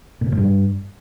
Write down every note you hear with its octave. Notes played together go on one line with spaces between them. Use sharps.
A#2
C3
A2
G2